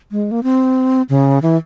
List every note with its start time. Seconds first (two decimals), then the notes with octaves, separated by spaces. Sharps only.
0.11 G#3
0.31 A#3
0.43 C4
1.09 C#3
1.42 E3